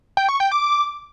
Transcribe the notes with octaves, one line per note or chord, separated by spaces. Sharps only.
G5
C#6
G5
D6